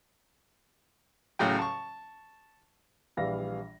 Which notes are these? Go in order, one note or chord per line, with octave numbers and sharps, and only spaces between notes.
A1 A2 C#3 F#3 G5
A5 C#6
A#1 E3 G3 E5 F5 A#6